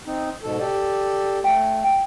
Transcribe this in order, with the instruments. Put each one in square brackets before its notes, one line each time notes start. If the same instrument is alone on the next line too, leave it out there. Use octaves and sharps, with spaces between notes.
[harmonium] C4 D#4
G#2 B2 A4
G4 A4 D5
[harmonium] A3 [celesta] G5
[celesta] G5